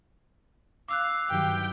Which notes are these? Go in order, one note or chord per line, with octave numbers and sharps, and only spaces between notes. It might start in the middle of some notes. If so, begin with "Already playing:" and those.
F5 D6 E6 F#6
G2 D#3 F#3 G4 G5